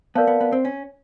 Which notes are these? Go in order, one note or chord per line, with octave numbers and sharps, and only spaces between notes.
B3 A#4 D5 F5 A5
B3
B3
C4
C#4